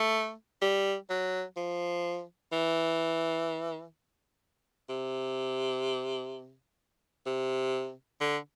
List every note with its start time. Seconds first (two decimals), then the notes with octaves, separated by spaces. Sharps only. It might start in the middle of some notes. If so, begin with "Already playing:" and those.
Already playing: A3
0.62 G3
1.10 F#3
1.57 F3
2.52 E3
4.89 C3
7.26 C3
8.21 D3